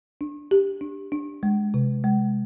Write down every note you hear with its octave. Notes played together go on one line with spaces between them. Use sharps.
D4
G4
D4
D4
G#3
C3
G#3